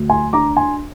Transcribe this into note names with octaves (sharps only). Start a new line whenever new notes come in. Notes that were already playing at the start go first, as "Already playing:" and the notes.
Already playing: D2
G#5 C6
D4 A#5 D6
G#5 C6